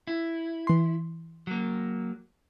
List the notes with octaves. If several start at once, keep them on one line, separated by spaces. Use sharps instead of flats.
E4
E3 C6
F#3 A#3